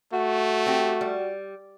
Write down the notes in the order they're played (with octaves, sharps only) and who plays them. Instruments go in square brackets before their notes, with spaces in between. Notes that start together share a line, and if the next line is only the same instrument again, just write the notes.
[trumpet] A3 [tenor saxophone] F#4
[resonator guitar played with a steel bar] C4 G4
G3